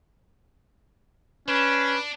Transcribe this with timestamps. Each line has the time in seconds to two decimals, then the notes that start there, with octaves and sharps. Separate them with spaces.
1.48 C#4 D4 B4